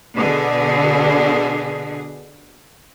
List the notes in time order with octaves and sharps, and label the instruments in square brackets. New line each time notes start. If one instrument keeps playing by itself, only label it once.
[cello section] B2 D3 G#4